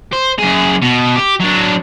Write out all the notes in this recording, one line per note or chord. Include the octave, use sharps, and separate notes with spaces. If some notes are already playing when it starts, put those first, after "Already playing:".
C5
F#2 G#4
B2
G4
F#3 D4